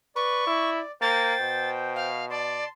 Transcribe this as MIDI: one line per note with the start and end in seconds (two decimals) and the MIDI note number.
0.16 0.46 71
0.16 0.91 74
0.16 0.70 85
0.47 0.80 64
1.01 1.34 58
1.01 2.09 72
1.01 2.09 79
1.01 1.70 93
1.41 2.64 47
1.96 2.25 77
2.30 2.65 74
2.30 2.69 81
2.30 2.69 84